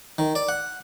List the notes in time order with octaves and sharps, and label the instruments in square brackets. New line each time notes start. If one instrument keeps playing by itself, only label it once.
[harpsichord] D#3
D5
F#5